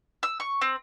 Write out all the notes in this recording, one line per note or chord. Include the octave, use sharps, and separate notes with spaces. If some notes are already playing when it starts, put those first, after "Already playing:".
E6
C#6
C4